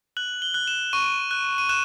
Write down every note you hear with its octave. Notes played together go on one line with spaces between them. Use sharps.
F#6 F#7
G7
F#6
E7
C#6 D#7
F#6
D#7
F#6 E7